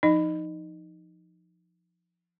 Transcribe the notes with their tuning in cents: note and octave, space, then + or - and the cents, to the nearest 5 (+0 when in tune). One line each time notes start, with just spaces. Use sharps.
F3 -5 D#4 +0 D#5 -25